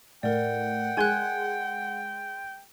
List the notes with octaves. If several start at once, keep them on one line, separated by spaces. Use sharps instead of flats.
A2 A#4 D5 F#5 G5
G#3 G#5 C6 F#6 G#6